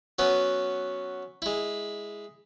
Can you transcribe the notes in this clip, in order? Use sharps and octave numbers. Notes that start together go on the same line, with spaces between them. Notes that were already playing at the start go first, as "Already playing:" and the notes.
F#3 B3 C#4
G#3 E4